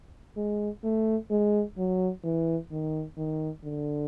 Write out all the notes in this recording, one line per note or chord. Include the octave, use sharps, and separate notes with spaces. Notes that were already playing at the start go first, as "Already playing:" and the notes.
G#3
A3
G#3
F#3
E3
D#3
D#3
D3